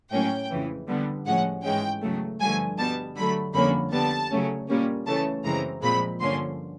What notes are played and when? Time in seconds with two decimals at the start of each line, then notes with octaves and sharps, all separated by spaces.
0.12 A2 F#3 A#3 C#4 G5
0.50 F2 C#3 E3
0.88 D3 G3 B3
1.26 A2 F3 G#3 C#4 F#5
1.64 G#2 E3 G#3 C#4 G5
2.01 E2 C#3 F#3 A3
2.40 G2 D3 F3 A3 G#5
2.78 B2 G3 B3 A5
3.16 D3 F#3 A3 B5
3.53 F2 D3 G3 A#3 C#4 B5
3.92 D3 G3 B3 A5
4.30 C#3 F#3 A3 C#4
4.68 A#2 G3 A#3 C#4
5.06 C#3 E3 A3 C#4 A5
5.44 F#2 C#3 E3 G#3 C4 A#5
5.82 A#2 F3 G#3 C4 B5
6.20 G2 D3 F3 A#3 C#4 C6